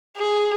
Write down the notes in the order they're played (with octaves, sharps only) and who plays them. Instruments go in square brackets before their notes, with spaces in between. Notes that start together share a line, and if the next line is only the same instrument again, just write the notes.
[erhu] G#4